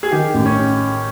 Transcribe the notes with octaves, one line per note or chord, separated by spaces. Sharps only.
G#4
D#3 G4
A1
C#4